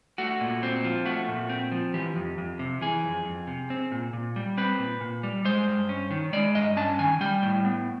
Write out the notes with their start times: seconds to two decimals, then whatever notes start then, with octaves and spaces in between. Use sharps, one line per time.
0.18 A3 F#4
0.41 A#2
0.63 C4
0.84 F3
1.05 A3 F#4
1.28 A#2
1.49 C4
1.72 F3
1.94 E3 G4
2.16 F2
2.38 F2
2.59 C3
2.81 E3 G#4
3.04 F2
3.25 F2
3.47 C3
3.70 C4
3.91 A#2
4.13 A#2
4.36 G3
4.57 C4 B4
4.79 A#2
5.01 A#2
5.23 G3
5.45 G#3 C5
5.67 G2
5.89 C#4
6.11 D#3
6.33 G#3 D5
6.55 G2 D#5
6.76 C#4 A5
6.99 D#3 G#5
7.21 G3 G5
7.42 A2
7.65 B3